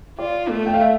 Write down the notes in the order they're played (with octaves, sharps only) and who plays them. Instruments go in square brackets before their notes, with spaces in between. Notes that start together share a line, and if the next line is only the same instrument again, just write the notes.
[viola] F4 [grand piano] D5
[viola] A3
[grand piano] G5
F5
E5